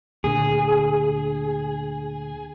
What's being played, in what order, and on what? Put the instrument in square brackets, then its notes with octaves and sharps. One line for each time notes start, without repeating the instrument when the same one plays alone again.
[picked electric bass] D2 A#2 D3 [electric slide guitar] G#4